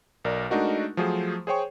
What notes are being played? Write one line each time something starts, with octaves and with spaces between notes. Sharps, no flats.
B1 A#4 D5
G#3 A3 D4 D#4 F#4 A#4
F3 F#3 A3 G#4 C5
G#4 C5 C#5 G5 C#6